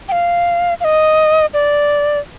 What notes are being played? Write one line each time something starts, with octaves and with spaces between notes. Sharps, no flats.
G5
F5
F5
D#5
D5